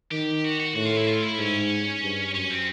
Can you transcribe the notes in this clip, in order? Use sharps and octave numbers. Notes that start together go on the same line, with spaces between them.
D#3 G4
F#4
F#4
A2 F#4
F4
E4
F4
E4
G#2 C#4
G2
F#2 C#4
C4